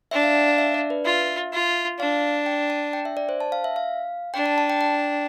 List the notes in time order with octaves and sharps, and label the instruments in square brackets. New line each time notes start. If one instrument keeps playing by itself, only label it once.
[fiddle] D4 [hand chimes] E5
[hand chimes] F5
G5
F5
E5
D5
B4
[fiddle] F4 [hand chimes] E5
[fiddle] F4
[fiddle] D4 [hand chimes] F5
[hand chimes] G5
A5
G5
E5
D5
C5
A5
F5
E5
F5
[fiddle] D4 [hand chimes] G5
[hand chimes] A5
A5
G5
G5